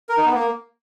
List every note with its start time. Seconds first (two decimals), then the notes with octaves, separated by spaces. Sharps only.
0.09 A#4
0.17 D#4
0.26 B3
0.34 A#3